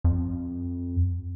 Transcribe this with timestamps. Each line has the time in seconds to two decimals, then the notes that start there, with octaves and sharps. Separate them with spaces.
0.04 F2